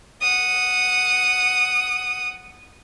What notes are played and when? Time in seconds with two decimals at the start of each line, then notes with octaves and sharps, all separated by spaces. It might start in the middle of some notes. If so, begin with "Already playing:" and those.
0.22 F#5 D#6